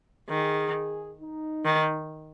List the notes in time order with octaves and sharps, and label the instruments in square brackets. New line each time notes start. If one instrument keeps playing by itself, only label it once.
[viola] D#3 [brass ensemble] G#4
[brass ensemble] D#4
[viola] D#3